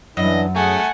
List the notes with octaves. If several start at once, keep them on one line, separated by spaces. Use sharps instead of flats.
F#2 E3 D4 E4 D#5
A3 G#4 F#5 G#5